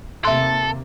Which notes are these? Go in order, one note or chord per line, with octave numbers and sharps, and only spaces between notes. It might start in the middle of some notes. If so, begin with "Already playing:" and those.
D#2 C3 A#3 A4 E5 C6